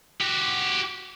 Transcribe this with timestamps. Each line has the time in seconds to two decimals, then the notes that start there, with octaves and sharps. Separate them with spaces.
0.21 F#4 G4